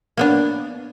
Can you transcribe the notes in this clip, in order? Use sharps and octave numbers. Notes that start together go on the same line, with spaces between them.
A#3 B3 D4